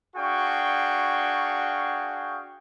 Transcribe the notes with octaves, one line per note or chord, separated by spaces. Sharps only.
D4 F#4 G#4 F5 G5 C#6